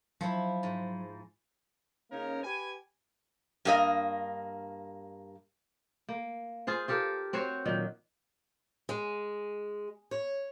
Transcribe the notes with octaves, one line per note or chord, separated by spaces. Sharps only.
F3 F#3 E4
G#2
C#3 A#3 C#4 D#4 A#4
G4 B4 G#5
G2 A#3 D#5
A#3
F4 G#4 C5
F4 G4 A4 A#4
C4 F#4 C5 C#5
A#2 D#3 F#3
G#3
C#5